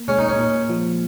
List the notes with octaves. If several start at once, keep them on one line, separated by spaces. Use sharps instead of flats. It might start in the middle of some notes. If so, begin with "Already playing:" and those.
Already playing: A#3
G#3 C#4
D#4
C#4
A#2
F3